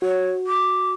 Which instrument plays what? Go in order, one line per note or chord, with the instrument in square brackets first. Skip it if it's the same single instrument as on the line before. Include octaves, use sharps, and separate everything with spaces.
[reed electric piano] F#4 [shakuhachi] C#5
[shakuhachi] D6